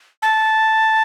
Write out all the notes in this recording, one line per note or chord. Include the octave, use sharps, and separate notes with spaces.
A5